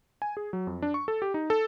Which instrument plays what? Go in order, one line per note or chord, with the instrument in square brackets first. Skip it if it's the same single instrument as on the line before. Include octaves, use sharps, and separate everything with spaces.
[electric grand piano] G#5
G#4
F#3
F2
D4
C#6
A4
G4
D#4
A4